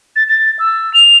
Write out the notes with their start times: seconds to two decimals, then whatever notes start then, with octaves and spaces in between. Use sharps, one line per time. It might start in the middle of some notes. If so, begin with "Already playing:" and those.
0.16 A6
0.29 A6
0.59 E6
0.94 F7